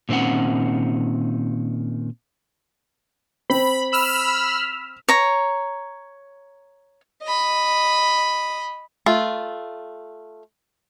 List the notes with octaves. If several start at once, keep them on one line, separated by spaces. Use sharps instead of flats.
A#2 D#3 C4 C#4 F#5
C4 B5
B5 E6 F6
C#5 A#5
D#5 B5
A3 F4